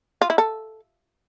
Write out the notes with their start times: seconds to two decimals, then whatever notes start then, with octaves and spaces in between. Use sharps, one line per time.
0.21 F4
0.30 E4
0.38 A4